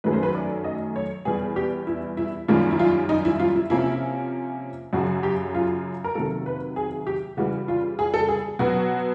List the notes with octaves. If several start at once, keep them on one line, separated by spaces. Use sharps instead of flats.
F#2 D#3 F#3 A3 C#4 B4
C5
B4
D5
D#5
C#5
E2 B2 G3 B3 G#4
G4
E4
E4
F#2 D#3 G3 A#3 C#4 F4
E4
F4
D#4
E4
F4
E4
C3 F3 A#3 C#4 E4
F#2 C#3 F#3 F#4
G4
F4
A#4
C3 D#3 F#3 A#3 A4
B4
G#4
G4
C#3 E3 G3 F#4
F4
G#4
A4
G#4
B2 F#3 B3 F#4